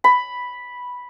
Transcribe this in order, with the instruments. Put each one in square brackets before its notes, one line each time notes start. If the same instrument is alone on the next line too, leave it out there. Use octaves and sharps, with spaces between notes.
[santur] B5